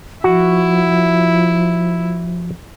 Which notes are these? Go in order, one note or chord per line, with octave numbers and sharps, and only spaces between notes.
F3 E4 F#4